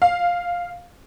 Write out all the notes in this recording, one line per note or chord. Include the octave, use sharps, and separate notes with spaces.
F5